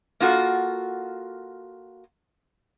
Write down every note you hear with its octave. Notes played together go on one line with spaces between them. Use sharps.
A#3 F4 F#4 A4